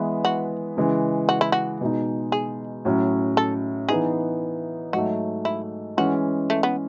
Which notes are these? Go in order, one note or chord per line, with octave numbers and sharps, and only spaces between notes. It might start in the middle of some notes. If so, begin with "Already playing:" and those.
Already playing: E3 G#3 B3 E4 B4
F#4
C#3 E3 G#3
F#4
E4
F#4
B2 G#3 D#4
G#4
A2 F#3 C#4
A4
E3 B3 D#4 G#4
G#2 F#3 A3 F#4
E4
E3 G#3 C#4 F#4
A3
B3